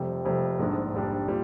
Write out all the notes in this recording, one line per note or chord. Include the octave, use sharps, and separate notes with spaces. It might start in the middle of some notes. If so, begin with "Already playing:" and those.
Already playing: F1 F2 C3 G3
F1 F2 C3 G3
A#1 G#2 G3 D4
A#1 G#2 G3 D4
A#2 G3